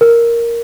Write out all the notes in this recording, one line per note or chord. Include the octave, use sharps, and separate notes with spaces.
A#4